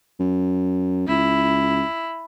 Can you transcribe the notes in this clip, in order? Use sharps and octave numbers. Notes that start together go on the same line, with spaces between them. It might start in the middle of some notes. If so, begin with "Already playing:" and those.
F#2
C#2 E4